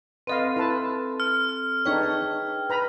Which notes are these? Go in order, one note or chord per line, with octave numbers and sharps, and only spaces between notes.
C4 A4 B4 D#5 F5
E4 B4 A5
F6
D4 D#4 G#4 B4 C#5 G5
B4 A#5 B5